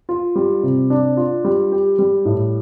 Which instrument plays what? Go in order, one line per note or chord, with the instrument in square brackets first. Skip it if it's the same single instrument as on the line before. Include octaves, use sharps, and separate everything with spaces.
[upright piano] F4
G3
C3
D4
F4
G3
G4
G3
A2